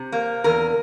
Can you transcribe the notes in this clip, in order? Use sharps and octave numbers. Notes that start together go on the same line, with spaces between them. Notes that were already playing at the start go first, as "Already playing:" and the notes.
Already playing: C3
A#3
E2 A#4